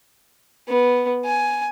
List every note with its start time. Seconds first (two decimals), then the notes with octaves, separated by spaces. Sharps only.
0.68 B3
1.25 G#5